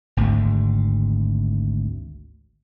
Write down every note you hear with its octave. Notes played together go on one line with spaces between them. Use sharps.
G#1 D2 G#2